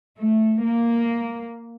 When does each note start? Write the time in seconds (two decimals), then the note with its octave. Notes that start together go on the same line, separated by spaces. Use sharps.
0.18 A3
0.62 A#3